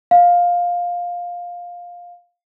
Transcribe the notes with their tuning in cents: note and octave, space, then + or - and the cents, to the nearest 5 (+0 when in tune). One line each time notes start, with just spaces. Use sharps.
F5 +10